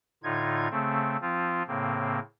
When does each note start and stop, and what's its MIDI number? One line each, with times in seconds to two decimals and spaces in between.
0.23 0.68 45
0.23 0.68 50
0.23 0.68 63
0.23 0.68 65
0.23 0.68 92
0.71 1.17 49
0.71 1.17 57
0.71 1.17 60
1.21 1.63 53
1.21 1.63 60
1.21 1.63 65
1.68 2.19 45
1.68 2.19 49
1.68 2.19 58
1.68 2.19 60